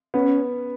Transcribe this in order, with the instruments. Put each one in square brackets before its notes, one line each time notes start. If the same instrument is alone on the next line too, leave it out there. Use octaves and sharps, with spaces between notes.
[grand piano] B3 [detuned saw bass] C#4